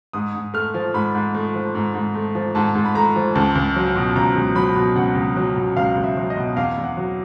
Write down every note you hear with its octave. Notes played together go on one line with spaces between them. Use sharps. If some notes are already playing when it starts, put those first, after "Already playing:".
G#2 D#6
G#2
A3 F6
F3
G#2 B5
G#2
A3
F3
G#2
G#2
A3
F3
G#2 A5
G#2
B5
A3 A#5
F3
C#2 A5
C#2
F#3
B2
C#2 A#5
C#2
F#3 B5
B2
C#2 F#5
C#2
F#3
B2
C#2 F5
C#2
E5
F#3
D#5
B2
E2 F5
E2
F#5
F#3